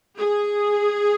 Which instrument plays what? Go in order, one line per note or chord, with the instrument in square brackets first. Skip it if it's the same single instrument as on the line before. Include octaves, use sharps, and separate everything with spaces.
[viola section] G#4